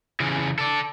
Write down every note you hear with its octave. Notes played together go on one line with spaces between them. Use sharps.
C#3 E3
A4 D5